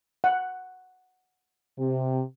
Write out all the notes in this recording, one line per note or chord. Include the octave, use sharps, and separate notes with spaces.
F#5
C3